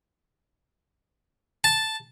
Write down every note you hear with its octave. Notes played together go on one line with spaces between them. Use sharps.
A5